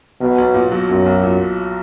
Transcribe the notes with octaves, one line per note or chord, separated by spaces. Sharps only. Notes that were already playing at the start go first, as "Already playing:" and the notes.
B1 B2
B1
A#2
F#3
B1 F#2
B1
A#2